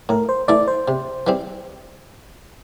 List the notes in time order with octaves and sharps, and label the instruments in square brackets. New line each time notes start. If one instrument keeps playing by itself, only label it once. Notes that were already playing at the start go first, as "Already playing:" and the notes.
[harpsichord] A2 [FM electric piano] A#4
[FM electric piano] C5
[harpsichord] E3 A3 E4 [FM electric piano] D5
[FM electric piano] C5
[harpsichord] C3
E3 G3 C4